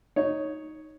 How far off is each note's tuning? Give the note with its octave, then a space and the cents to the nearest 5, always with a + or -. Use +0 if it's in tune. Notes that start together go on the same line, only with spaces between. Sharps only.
D#4 +0 C#5 +0